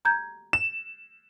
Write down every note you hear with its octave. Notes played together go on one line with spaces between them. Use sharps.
A#5 G6 G#6
E7